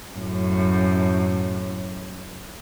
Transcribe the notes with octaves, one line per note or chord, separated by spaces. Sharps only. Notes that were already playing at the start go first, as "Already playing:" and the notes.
F#2 A2